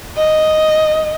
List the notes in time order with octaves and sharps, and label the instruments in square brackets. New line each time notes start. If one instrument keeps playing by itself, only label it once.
[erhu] D#5